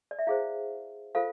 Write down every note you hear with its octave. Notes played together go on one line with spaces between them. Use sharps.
D5
E5
E4 G#4 C5 F5
F4 A4 C5 F5